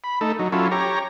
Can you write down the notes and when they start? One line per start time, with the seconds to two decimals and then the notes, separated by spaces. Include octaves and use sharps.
0.04 B5
0.21 A3 D#4 A4
0.39 F#3 D#4
0.52 F#3 C#4 E4 F4 A4
0.72 G4 C#5 A#5